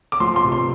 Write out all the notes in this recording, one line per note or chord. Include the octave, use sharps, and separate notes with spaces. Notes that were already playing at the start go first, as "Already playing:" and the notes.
D6
F3 C6
C6
C3
C6